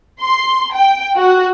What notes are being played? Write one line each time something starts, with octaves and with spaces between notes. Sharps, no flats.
C6
G5
F#4